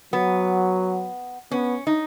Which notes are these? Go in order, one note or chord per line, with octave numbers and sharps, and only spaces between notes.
F#3 B3
B3 C#4
D#4